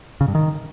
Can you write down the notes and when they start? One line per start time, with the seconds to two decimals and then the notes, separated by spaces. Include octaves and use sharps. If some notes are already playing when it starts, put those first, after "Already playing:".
0.21 C#3
0.28 G2
0.35 D#3